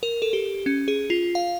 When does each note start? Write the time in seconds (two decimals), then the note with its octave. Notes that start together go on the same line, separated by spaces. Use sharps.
0.03 A#4
0.22 A4
0.33 G4
0.66 C#4
0.88 G#4
1.10 F4
1.35 F5